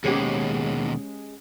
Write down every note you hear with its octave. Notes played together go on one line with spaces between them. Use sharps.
D#2 B2 G#3 C#4 G4